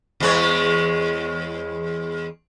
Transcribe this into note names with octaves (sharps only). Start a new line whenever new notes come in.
E2 G#3 C#5